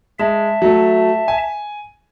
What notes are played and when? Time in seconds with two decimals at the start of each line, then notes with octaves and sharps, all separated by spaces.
0.19 G#3 E5 A5
0.62 F#3 A3
1.28 G#5